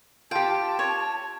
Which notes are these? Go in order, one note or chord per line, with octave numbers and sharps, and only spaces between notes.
F4 G4 G5 A5
C#5